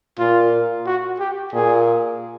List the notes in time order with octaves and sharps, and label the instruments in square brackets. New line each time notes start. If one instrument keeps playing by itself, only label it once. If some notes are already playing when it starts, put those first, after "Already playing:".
[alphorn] A#2 [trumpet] F4
[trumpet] F#4
G4
[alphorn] A#2 [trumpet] G#4